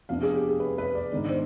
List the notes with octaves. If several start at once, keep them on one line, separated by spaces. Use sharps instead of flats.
F2 C3 F3 B3 D4 F5
G#4
G4
G#4
B4
B4
D5
G#2 D#3 B3 D4 D5
C5